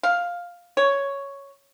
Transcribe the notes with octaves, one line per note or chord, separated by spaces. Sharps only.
F5
C#5